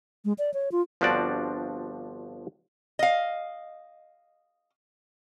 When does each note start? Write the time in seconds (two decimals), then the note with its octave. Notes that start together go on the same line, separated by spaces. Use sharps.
0.25 G#3
0.38 D5
0.54 C#5
0.72 F4
1.01 G1 F3 C4 D4 F#4 D5
2.99 D#5 F5